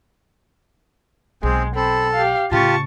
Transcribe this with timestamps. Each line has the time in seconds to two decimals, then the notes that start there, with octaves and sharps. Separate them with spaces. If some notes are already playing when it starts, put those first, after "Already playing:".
1.43 B1 G#3 C4 G#4
1.75 C4 A4 B5
2.13 G4 F5
2.51 A2 C#3 F4 G4 A5 C#6